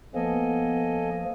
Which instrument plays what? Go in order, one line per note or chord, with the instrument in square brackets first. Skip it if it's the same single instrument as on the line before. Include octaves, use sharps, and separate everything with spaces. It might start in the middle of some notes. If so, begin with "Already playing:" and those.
[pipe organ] F3 A#3 [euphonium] B3 [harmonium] A4 D#5 G#5